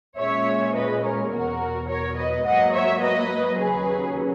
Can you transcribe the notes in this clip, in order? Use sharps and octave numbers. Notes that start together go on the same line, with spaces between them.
A#2 G#3 C#4 C#5 E5
B4 D#5
A#4 C#5
E2 B2 F#3 F#4 A#4
A#4 C#5
B4 D#5
G#2 F#3 A#3 D#5 F#5
C#5 E5
B4 D#5
D#2 C#3 F#3 C#4 G#4 B4